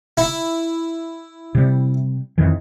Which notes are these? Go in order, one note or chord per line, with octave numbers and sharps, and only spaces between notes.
E4
C3 G3
F2 D#3 E3